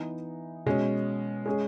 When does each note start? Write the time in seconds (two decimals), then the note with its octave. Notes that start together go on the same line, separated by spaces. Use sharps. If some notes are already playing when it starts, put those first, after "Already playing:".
Already playing: E3 B3 D#4
0.66 B2 G#3 C#4
1.46 G#3 C#4 G#4